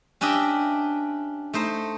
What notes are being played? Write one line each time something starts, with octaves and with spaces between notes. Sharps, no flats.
C#4 D4 G4 D#5 E5 G5
A3 D#4 C5